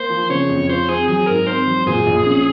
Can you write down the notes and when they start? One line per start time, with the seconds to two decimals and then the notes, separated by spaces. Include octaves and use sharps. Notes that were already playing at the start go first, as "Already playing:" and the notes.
Already playing: A#3 C5
0.10 F3
0.30 C#3 C#5
0.49 F2
0.69 F4 C5
0.89 C4 G#4
1.08 F#3 G#4
1.27 G#2 A#4
1.47 C4 C5
1.66 F#3
1.86 A#2 G#4
2.06 A#1
2.26 C#4